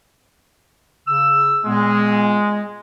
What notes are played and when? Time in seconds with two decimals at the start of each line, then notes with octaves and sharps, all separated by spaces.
1.08 C#3 E6
1.65 A#2 G#3 B3